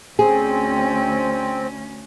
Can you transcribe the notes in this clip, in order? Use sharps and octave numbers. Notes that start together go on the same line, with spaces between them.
D2 C4 C#4 G#4